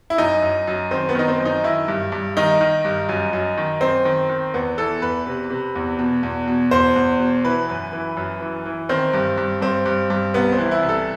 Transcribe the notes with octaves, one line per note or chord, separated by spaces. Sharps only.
E4
F#2 D#4
F#2
F#2
D#3 C4
B3
D#3 D#4
C4
F#2
D#4
D#3 E4
G2
G2
D#3 D#4
D#3
G2
F#2
F#2
D#3
F#2 C4
D#3
D#3
E2 B3
E3 A4
E2 B4
C3
C3
E2
B2
E2
B2
E2 C5
E2
B2
E3 B4
F#2
E3
F#2
E3
E3
D#3 C4
G2
G2
G2 C4
G2
G2
C2 B3
C4
E3
E4
C2
A4